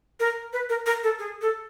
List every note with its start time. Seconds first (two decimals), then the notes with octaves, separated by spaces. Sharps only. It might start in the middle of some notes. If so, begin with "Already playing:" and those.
0.20 A#4
0.53 B4
0.69 A#4
0.86 A#4
1.03 A4
1.19 G#4
1.42 A4